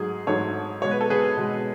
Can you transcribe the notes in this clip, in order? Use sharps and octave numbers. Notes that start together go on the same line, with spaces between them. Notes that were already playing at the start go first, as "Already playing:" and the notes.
Already playing: G#2 F#3 A3 G#4
G#2 F#3 A3 A4 C#5
B2 G#3 C#5
B4
A4
G#4 B4
B2 G#3